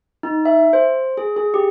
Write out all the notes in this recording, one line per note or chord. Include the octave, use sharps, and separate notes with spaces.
D#4
E5
C5
G#4
G#4
G4